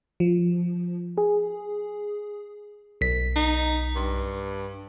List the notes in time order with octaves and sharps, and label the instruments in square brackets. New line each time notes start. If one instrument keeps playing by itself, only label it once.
[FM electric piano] F3
G#4
[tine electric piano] B1 B6
[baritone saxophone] D#4
G2